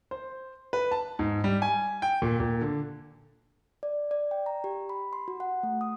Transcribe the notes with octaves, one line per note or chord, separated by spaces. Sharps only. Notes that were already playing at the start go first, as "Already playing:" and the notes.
C5
B4
A5
G#2
G3
G#5
G5
A#2
A#2
D3
D5
D5
G5
A#5
G4
B5
C6
F#4
F#5
A3
D#6